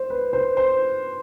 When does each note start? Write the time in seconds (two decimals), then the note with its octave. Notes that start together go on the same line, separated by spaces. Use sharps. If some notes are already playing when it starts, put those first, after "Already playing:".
Already playing: C5
0.10 B4
0.33 C5
0.57 C5